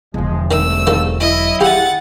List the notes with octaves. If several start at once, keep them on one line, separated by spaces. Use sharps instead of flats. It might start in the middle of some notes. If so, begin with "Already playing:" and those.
E1 D3 F3 G#3
C2 G#2 D#3 A3 E6
D#3 F3 A4
F#3 E4 D#5
F4 G4 F#5 A6